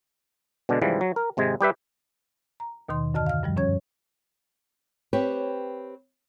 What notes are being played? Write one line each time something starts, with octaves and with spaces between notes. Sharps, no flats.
B2 D3 G#3 D4
G#2 C#3 E3 F3 G3
F#3
A#4
G#1 C3 G#3 G#5
G3 G4 B4 E5
A#5
D#2 B2 D#3 C6
F#2 D3 D#5 A5 F6
F5 F6
G2 F3 G3
F#2 C#4 C#5 G#6
C4 G4 B4 C#5